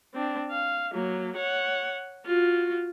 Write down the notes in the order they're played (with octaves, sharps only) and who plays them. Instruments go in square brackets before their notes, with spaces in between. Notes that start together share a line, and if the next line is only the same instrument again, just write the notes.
[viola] C4 D4
F5
F#3 A#3
C#5 F#5
F4 F#4